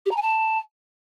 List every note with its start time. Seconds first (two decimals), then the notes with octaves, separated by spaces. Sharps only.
0.06 G4
0.11 A#5
0.16 G#5
0.22 A5